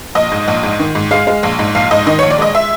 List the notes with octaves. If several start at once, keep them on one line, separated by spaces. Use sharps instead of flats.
A#1 D#5
G#2
A#1
G#2
D#3
G#2
G#3 F5
G#3
A#1
G#2
A#1 F5
G#2 D#5
D#3 D#5
C#5
A#1
D5
G#3 D#5
E5